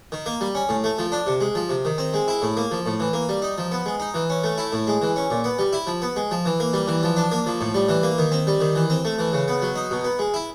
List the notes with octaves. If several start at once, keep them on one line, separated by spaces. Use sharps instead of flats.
D#3
A#3
G3
C#4
A2
A3
F3
D4
C3
G#3
F3
C3
D#3
C4
G#3
E4
A2
A#3
F3
A2
E3
A#3
G3
D#4
F3
B3
G#3
D#4
E3
C#4
A3
E4
A2
G#3
E3
C#4
A#2
B3
G3
E4
F3
B3
G#3
F3
E3
A#3
G3
E3
F3
D4
A#3
F3
A2
G3
E3
A#3
D#3
C4
G3
D#3
E3
C4
A3
E3
C#3
B3
F#3
D#4
B2
B3
G#3
E4